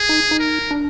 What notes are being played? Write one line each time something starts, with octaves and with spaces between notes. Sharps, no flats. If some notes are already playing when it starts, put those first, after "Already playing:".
Already playing: G#4
D#4
D#4
A#4
D4